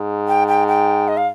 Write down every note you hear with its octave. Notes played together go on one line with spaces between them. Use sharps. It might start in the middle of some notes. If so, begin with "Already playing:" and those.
Already playing: G#2
G5
G5
G5
D#5
F5